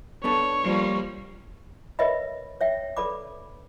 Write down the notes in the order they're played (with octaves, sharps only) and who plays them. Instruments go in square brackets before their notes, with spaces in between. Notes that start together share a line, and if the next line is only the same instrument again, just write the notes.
[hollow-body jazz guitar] B3 D4 A4 [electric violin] C#5
[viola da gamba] F3 G3 A#3
[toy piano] A#4 B4 C#5 D#5 E5 B5
C#5 E5 G5
A4 B4 D5 B5 D6